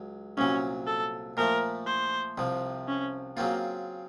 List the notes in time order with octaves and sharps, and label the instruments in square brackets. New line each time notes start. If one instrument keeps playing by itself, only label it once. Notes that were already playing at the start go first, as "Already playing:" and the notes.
Already playing: [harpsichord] C#2 F#3
[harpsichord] C2 A#2 F#3 [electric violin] C#4
[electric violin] A4
[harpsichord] A#2 F3 A3 [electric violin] A#4
[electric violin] C5
[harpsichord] C2 C3 F3
[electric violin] C#4
[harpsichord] C#3 F#3 C4 F4 [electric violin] A#3